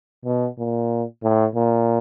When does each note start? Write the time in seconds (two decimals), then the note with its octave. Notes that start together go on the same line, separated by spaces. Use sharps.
0.25 B2
0.58 A#2
1.23 A2
1.55 A#2